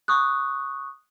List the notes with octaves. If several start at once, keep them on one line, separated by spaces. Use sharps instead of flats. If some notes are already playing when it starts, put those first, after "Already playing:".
C#6 D#6 F#6